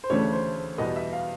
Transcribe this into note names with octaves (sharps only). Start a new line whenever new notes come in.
C5
D2 C#3 E3 A3 D4 C#5
C5
E2 B2 G3 B3 D#5
E5
F5